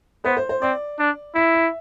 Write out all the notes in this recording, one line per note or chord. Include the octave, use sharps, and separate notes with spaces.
B3 C5
C5
C5
C4 D5
D4
E4 E5
E5